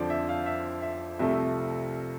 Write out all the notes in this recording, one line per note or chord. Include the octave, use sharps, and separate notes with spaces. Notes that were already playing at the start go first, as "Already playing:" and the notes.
Already playing: F2 D3 F3 C5 D5
E5
F5
E5
E5
C2 C3 F3 A3 E5